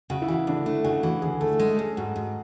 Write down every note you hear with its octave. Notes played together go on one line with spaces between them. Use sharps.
C#3 F#4
E4
E3 F#4
D2 D4
A3 E4
C#3 F#4
E3 F#4
D2 G#4
A3 A4
G#3 A4
C#4 G#4
G#2 F#4
G#2